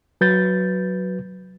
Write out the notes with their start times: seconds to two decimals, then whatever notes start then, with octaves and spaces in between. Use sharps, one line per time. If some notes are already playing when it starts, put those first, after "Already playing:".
0.21 F#3 B4 G6 A6